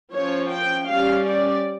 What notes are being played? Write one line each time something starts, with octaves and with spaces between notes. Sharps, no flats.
F3 C#4 C#5
G5
G3 C#4 F5
D5